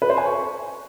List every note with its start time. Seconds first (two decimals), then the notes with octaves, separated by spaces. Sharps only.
0.02 B4
0.10 C5
0.18 G#5
0.25 C#6